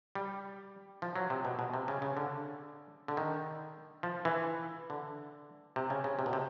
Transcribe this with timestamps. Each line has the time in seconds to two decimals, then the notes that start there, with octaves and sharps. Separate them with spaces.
0.15 G3
1.02 F3
1.16 F#3
1.30 C3
1.45 B2
1.59 B2
1.74 C3
1.88 C#3
2.02 C#3
2.17 D3
3.08 D3
3.17 D#3
4.03 F3
4.25 E3
4.90 D3
5.76 C3
5.90 C#3
6.04 C#3
6.19 C3
6.26 B2
6.33 C3